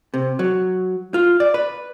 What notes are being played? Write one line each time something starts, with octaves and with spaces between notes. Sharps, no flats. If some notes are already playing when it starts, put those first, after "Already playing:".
C3
F#3
F4
D5
B4